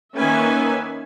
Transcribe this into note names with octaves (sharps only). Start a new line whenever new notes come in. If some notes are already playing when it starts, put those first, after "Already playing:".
D#3 A#3 C#4 B4 E5 G#5